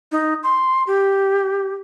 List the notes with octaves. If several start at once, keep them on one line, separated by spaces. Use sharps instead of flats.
D#4
C6
G4